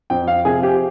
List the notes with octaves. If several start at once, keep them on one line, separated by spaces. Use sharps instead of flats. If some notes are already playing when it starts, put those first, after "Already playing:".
F2 G5
F5
C3 F3 G#4
G4